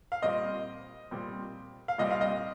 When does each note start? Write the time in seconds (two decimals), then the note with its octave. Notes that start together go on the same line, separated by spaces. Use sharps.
0.12 F5
0.22 A#2 G3 C4 D#5
1.11 A#2 G3 C4
1.88 F5
1.98 C2 A#2 G3 C4 D#5
2.11 F5
2.21 D#5